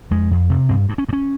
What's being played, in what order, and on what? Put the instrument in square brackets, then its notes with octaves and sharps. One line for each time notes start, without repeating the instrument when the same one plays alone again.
[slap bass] F2 G#3
F2
C3
G2 C4
G2
C#4
G2
C#4